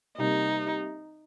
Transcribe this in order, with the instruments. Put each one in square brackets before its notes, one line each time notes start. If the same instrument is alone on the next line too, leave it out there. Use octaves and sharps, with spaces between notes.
[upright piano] C3 G3 A#3 [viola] D#4